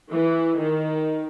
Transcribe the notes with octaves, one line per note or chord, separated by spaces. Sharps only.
E3
D#3